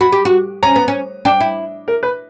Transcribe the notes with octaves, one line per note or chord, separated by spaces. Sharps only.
F#4 B5
G4
F#4
C#4 A#5
B3
C#4
D4 G5
E4
A#4
B4